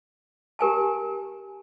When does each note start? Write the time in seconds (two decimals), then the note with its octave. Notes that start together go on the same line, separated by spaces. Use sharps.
0.59 G4 A#4 G#5 A5